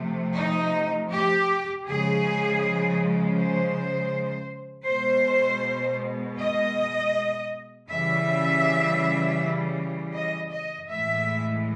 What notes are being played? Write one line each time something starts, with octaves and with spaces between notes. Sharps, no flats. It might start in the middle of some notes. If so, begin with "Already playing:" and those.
Already playing: C3 F3 A3
D#4
G4
C#3 F3 G#3 G#4
C5
B2 G#3 C5
D#5
C#3 E3 G3 E5
D#5
D#5
A2 E3 G#3 E5